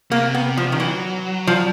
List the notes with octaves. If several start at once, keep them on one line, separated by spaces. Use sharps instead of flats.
C3 A#3
B3
F3
D#3
E3 F#3
F3